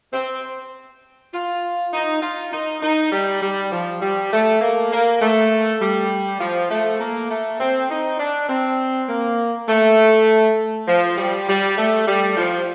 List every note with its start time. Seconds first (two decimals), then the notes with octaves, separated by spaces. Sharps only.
0.14 C4
1.34 F4
1.93 D#4
2.23 F4
2.52 D#4
2.82 D#4
3.12 G3
3.42 G3
3.72 F3
4.02 G3
4.32 A3
4.61 A#3
4.92 A#3
5.21 A3
5.81 G3
6.40 F3
6.71 A3
7.00 A#3
7.30 A3
7.60 C4
7.90 D#4
8.19 D4
8.49 C4
9.09 A#3
9.69 A3
10.88 F3
11.18 G3
11.48 G3
11.78 A3
12.08 G3
12.37 F3